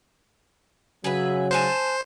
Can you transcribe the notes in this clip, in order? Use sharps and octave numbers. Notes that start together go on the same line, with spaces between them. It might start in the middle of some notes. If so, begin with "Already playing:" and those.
C#3 F#3 G#4 B4 E5
C5 G#5 A5 F#6